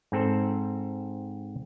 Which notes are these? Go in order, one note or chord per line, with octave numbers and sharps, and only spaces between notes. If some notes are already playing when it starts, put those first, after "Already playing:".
G#2 C4 A4 C5